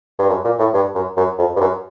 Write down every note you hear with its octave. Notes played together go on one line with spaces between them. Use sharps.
G2
F#2
A#2
A2
G2
F#2
F#2
F2
G2
F#2